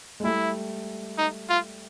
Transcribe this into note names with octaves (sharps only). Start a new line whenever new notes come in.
G#3
G3 A3 E4
D#4
F4